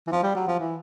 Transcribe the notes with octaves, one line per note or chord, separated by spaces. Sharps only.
E3
F3
G3
F#3
F3
E3